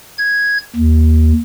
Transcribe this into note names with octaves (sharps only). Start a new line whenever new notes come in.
G#6
D#2